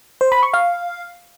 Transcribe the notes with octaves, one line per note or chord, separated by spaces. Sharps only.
C5
B5
C#6
F5